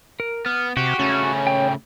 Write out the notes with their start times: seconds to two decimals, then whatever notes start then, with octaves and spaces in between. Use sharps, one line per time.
0.20 A#4
0.46 B3 F6
0.77 C3 F#4 G4
0.99 C#3 A3 C#4
1.47 G5